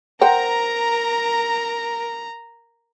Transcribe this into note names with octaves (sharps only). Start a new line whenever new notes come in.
A#4 C5 F#5 G5 A#5